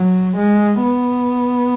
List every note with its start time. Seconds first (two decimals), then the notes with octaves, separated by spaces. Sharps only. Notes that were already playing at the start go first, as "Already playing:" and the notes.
Already playing: F#3
0.36 G#3
0.82 B3